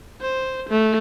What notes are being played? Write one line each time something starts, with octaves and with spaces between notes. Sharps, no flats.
C5
A3